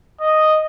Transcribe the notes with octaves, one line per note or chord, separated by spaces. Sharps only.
D#5